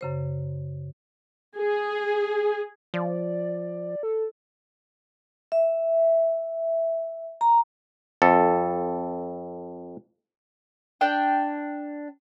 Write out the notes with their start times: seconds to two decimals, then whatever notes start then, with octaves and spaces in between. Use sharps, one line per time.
0.01 F#2 C#3 C5
1.55 G#4
2.94 F3 D5
4.03 A4
5.52 E5
7.41 A#5
8.22 F2 A4
11.01 D4 G5